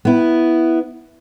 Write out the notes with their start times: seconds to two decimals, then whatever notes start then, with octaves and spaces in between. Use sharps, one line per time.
0.05 B3 E4